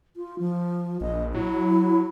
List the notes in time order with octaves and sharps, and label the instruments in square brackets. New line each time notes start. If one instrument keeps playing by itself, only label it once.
[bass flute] F4
F3
[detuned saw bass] A#1 [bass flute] D#5
[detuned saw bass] F#3 [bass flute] E4